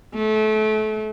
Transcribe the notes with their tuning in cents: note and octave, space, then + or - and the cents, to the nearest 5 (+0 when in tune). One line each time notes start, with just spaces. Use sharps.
A3 -30